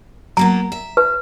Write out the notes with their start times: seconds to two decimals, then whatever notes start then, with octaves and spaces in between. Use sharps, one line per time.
0.37 F#3 A#3 B3 A#5
0.72 E5
0.97 B4